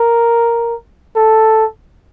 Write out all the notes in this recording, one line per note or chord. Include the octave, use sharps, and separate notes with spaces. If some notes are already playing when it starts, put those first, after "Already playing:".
Already playing: A#4
A4